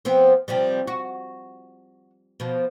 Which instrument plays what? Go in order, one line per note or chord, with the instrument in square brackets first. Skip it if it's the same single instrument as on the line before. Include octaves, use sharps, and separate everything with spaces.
[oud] F3 B3 C4
C3 F3 G3
F#4
B2 F3